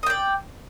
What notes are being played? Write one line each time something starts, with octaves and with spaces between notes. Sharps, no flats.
D5 D#5 G5